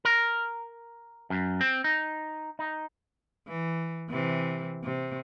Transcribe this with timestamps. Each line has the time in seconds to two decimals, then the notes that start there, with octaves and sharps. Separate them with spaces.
0.05 A#4
1.30 F#2
1.61 C4
1.84 D#4
2.59 D#4
3.48 E3
4.10 C3 E3
4.84 C3